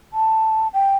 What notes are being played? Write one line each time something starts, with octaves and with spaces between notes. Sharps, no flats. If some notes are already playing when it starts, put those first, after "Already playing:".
A5
G5